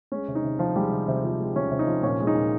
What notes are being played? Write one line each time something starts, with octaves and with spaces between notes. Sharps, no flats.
G#3 C#4
C3
D#4
C3
F3 F4
G3 G#3 G4
C3
C3
F3
G#3
C3 C#4
C3
D#4
F3
A#2 C#4
G#3
D#4
A#2